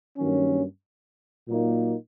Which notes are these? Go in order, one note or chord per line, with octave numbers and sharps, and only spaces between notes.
G2 D#3 F#3 A#3 C#4
A#2 F#3 A#3 D#4